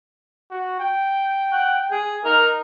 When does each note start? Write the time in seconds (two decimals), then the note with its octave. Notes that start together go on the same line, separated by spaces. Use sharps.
0.51 F#4
0.80 G5
1.52 F#5
1.91 G#4
2.25 D#4 A#4